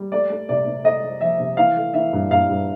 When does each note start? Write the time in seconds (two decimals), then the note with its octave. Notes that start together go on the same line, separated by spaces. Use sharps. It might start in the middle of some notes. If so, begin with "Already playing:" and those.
Already playing: G3
0.12 A3 D5
0.30 A3
0.49 C3 D5
0.66 C3
0.84 A3 D#5
1.04 A3
1.21 F3 E5
1.40 C3
1.57 E3 F5
1.76 A3
1.94 E3 E5
2.13 G2
2.31 G2 F5
2.49 G2